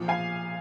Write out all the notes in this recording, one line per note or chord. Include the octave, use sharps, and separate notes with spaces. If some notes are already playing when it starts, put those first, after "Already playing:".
Already playing: A#2 F3
F5 G#5